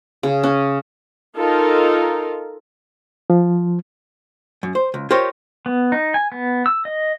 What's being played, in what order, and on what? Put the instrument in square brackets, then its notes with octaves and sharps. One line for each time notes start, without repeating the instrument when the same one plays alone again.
[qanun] C#3
C#4
[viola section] D#4 F4 A4 A#4
[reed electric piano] F3
[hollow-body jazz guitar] F#2
C5
C#2
F4 G4 A#4 C5 C#5 D#5
[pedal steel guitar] B3
D#4
G#5
B3
E6
D#5